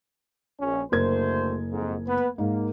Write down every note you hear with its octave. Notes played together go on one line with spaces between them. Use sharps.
A#1 C#4
F#1 D2 A3 A#4 C5 G#6
F2 G#2
B3 B4
G#2 A#3